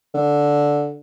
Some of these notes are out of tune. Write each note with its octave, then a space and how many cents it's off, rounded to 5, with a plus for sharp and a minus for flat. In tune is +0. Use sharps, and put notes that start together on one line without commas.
D3 -5